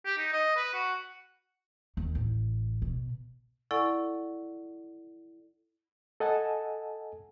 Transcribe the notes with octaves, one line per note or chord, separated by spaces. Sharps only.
G4
D#4
D#5
B4
F#4
D#2
A1
B2
E4 A4 D5 F#5 G#5 C#6
A4 D#5 F#5 G#5 A5